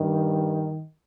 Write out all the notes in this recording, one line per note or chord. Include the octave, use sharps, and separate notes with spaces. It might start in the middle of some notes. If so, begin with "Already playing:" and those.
Already playing: G2 D#3